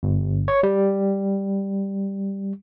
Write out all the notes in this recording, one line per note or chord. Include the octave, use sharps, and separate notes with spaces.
G1
C#5
G3